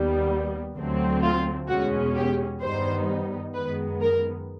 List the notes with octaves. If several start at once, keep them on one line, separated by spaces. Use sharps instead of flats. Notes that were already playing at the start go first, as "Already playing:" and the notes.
Already playing: D#2 D#3 G3 B3
D2 D3 F#3 A3 C4
F4
E2 B2 G#3 C#4 F#4
G4
G2 D#3 G3 B3 D#4 C5
F#2 D#3 G#3 B3 B4
A#4